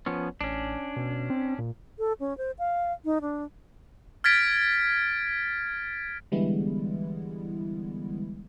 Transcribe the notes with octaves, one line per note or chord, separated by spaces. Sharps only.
F3 B3 C#4
A1 C#4 D4
B2
C4
A#2
A4
C#4
C5
F5
D#4
D4
F6 G#6 A6 B6 D7
D3 E3 G3 G#3 B3 E4